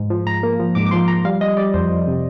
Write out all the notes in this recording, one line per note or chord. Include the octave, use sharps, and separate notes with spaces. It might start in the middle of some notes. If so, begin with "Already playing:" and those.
Already playing: G#2
F3
G#2 A#5
A#3
F3
G#2 D6
D6
F3 C6
F3 A#5
G3 F5
G3 D#5
G3 D5
F2 C5
F2
C3